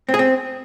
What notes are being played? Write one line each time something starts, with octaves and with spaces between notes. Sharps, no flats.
C4
G#4
C4